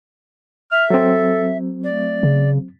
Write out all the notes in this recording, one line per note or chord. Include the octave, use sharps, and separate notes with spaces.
E5 F6
F#3 C4 A4
A3 D5
C#3